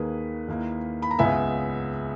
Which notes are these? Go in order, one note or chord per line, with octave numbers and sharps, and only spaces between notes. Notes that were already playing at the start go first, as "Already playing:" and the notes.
Already playing: D#2 D#3 A#3 G#4 B4
D#2 D#3 A#3 E4
B5
A#5
C#2 C#3 G#3 B3 E5 G#5